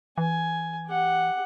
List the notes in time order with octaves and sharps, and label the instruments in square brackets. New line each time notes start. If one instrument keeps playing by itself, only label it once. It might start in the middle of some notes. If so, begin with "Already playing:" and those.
[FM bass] E3 [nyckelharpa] G#5
[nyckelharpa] G4 F#5